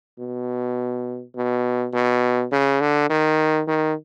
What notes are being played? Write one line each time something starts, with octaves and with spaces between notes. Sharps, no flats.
B2
B2
B2
C#3
D3
D#3
D#3